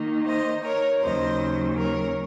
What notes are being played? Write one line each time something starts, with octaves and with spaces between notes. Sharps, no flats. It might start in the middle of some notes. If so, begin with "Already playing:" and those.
Already playing: D#3 A#3 D#4
C5 D#5
A#4 C#5
D#2 C#3 F#3 C5 D#5
A#4 C#5